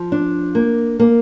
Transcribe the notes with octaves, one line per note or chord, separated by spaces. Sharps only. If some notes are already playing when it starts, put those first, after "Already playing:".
Already playing: F3
D4
A#3
A#3